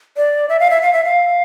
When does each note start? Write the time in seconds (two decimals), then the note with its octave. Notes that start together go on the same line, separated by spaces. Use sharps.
0.17 D5
0.49 E5
0.60 F5
0.70 E5
0.82 F5
0.93 E5
1.04 F5